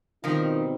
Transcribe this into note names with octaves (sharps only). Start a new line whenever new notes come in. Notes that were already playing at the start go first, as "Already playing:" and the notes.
B2 D#3 F3 G3 C4 D#4